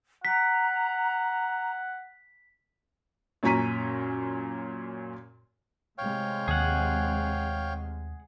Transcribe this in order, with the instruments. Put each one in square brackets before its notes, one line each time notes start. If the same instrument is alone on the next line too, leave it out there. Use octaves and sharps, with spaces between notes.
[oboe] F#5 [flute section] A#5 [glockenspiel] B6
[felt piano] F#2 A#2 C#4 A#5 B6 D#7
[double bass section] A2 C3 G#3 [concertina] C#5 F5 G5
[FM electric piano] D#2 [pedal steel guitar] G#4 F#5